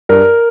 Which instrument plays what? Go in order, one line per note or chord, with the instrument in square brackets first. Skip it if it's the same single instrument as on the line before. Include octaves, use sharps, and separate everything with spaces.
[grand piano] G2 A#4